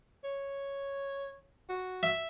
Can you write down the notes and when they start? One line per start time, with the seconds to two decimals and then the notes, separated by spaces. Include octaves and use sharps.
0.24 C#5
1.69 F#4
2.03 E5